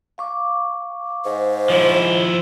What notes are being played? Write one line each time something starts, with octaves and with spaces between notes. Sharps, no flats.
F5 C#6 D6
G#2 C5
F3 E4